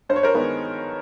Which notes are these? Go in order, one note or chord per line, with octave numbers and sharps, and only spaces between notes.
G2 C5
C#5
A#4 C5
D#3 G#3 B3